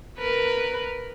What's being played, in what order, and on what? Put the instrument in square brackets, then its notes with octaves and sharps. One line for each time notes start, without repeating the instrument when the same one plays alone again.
[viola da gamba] A#4 B4